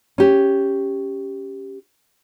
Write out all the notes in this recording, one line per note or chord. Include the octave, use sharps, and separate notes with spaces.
C#4 G4